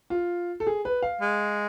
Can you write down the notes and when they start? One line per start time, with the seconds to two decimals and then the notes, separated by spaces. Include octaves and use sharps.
0.10 F4
0.60 A4
0.67 G#4
0.85 B4
1.02 F5
1.21 G#3